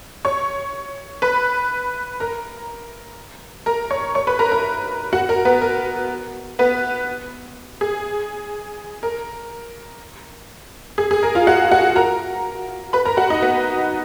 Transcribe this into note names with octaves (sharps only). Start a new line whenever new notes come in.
C#5 C#6
B4 B5
A#4 A#5
A#4 A#5
C#5 C#6
C#5 C#6
B4 B5
A#4 A#5
A#4 A#5
F#4 F#5
A#4 A#5
B3 B4
A#4
B3 B4
G#4
A#4
G#4
G#4
A#4
F4 F5
F#4 F#5
F#4 F#5
A#4 A#5
B4 B5
A#4 A#5
F#4 F#5
D#4 D#5
B3 B4